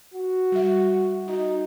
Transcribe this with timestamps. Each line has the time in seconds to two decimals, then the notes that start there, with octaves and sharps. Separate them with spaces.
0.14 F#4
0.52 G3 E5
1.28 D#4 F#4